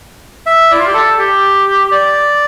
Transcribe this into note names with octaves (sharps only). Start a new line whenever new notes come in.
E5
E4 D5
F4
G4
A4
G4
D5